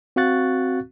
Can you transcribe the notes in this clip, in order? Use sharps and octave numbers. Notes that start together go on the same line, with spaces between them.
C4 F#4 F5 C#6 F#6 A6